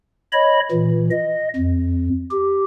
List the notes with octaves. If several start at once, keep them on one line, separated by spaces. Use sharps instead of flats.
C#5 D#5 B5
A#2 E3
D#5
F2
G4